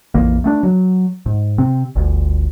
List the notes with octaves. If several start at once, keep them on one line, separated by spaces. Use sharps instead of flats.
A#1 F2 E3 A#3
A3 B3 D4
F#3
G#2
C3 C4
G1 D2